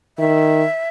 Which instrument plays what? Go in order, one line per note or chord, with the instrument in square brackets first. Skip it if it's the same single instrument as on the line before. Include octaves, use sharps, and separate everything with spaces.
[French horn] D#3 [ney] E5